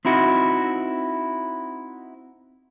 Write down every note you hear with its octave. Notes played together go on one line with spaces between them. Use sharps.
C4 D#4 E4 F#4